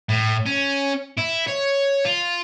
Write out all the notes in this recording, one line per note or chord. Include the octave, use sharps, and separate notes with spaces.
A2
C#4
E4
C#5
F4